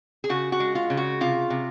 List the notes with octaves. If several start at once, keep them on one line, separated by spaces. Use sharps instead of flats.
G#4
C#3 F#4
F#4
G#3
F4
C#3
F#4
C3 F4
C3